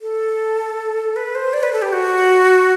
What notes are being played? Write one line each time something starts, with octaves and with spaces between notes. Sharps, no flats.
A4
B4
C5
D5
B4
A4
G4
F#4